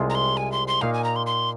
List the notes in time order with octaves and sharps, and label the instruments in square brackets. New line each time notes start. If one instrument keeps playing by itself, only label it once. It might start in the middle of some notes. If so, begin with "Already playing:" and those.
Already playing: [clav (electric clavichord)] C2 C3 G#3 F4
[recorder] A#5
C6
G#5
C6
C6
[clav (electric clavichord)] A#2 A#3 D#4 [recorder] F5
[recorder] G#5
A#5
C6
C6